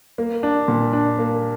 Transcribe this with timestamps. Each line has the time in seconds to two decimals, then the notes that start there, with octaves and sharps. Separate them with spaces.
0.18 A#3
0.43 D4
0.68 A#2
0.93 D4
1.19 A#3